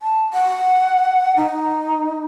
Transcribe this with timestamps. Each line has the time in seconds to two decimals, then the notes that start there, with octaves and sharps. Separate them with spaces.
0.02 A5
0.33 F#5
1.36 D#4